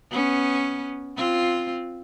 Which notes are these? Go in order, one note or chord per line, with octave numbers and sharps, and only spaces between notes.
B3 C#4
C4 F4